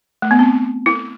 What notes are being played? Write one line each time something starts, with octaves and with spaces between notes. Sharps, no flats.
A3
B3
C4
E4